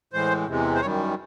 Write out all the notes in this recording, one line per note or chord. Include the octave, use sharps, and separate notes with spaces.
A2 E3 G#3 C5
E2 C3 E3 G#3
C5
F#2 D#3 G3 C#5